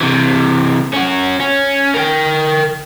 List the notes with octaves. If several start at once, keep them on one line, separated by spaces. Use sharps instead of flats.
C3 E3
C#4 F#4
C#4
A#4 G5